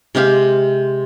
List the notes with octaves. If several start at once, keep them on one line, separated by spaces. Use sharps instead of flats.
C3 G#3 G4 F5